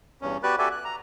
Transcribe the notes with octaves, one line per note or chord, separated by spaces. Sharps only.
E2 G2 C#4
B3 F#4 G4 B4 D5 F#6
F#4 G4 A4 D5 E5 G#5
F#6
A#5